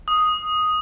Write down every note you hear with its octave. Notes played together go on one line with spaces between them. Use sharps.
D#6